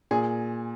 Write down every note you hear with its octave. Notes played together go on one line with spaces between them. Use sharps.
A#2 G#4